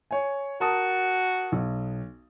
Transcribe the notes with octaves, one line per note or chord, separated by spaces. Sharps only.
C#5 G#5
F#4 A#4 A5 D#6
B1